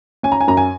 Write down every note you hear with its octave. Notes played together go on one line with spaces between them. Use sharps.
C#4 G#5
A#5
G#5
F#2 A#5
G#5